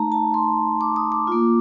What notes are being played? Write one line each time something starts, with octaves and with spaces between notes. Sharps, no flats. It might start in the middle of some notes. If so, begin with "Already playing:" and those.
Already playing: A3 D#4 A5 A#5
A5
C6
D6
D#6
D6
A#3 F4